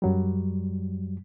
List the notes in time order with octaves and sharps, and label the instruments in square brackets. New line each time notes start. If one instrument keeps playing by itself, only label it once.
[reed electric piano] F#2 F#3 G3